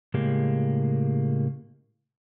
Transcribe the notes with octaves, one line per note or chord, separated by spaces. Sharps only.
A2 C#3 G#3 A#3 G4